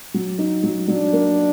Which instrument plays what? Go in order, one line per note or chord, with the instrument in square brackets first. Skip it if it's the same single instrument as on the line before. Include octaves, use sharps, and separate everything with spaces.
[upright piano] F#3
D#4
F#3
[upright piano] F#3 [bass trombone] D4
[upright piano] A#3